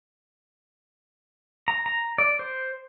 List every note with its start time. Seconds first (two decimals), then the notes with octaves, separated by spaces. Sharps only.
1.68 A#5
1.86 A#5
2.18 D5
2.39 C5